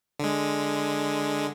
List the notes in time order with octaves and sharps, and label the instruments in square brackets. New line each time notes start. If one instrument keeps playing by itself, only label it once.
[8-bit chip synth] D3 G#3